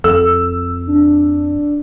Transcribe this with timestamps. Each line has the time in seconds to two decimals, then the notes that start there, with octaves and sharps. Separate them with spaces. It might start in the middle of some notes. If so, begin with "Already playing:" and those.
0.04 F2 A4 E6
0.87 D4